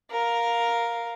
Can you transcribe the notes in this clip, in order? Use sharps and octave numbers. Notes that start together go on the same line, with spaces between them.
A#4 F5